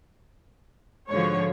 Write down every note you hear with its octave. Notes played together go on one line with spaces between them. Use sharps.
G#2 D3 F3 F#4 C#5